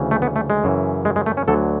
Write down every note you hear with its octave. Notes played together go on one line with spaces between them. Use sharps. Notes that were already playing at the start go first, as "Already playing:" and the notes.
Already playing: D2 C#3 E3
A3
B3
A3
G#3
F#2 C#3 E3
G#3
G#3
A3
C#4
D2 D3 F#3 A4